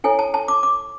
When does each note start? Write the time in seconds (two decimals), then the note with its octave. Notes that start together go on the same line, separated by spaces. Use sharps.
0.04 E4 A4 C#5 G#5
0.19 A5
0.34 A5
0.48 D6
0.63 D6